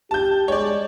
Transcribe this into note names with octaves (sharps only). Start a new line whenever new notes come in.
G4 A5 G6
G#3 C#5 D5